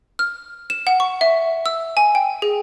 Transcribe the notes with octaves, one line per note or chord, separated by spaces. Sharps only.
F6
E7
F#5
C#6
E5
E6
G#5
G5
G#4